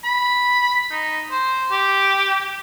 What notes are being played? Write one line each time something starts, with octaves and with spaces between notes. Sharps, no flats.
B5
D#4
C5
G4